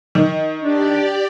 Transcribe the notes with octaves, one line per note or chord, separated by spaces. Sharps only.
D#3
D4 G4 D5